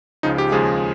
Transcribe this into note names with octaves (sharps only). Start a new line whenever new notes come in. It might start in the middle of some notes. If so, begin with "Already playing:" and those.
C#2 C#3 F3 D#4
G4
D#2 C#3 F3 G#3 G#4